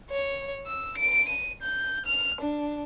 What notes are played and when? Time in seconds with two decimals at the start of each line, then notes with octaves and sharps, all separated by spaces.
0.10 C#5
0.66 E6
0.97 D7
1.29 D#7
1.62 G6
2.06 F6
2.41 D4